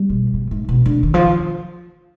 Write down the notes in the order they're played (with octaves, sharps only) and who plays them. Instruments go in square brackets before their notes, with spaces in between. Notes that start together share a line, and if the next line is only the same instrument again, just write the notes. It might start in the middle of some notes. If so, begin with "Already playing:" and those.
Already playing: [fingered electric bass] G3
[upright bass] B2
B2
G#2
B2
D3
D#3
F3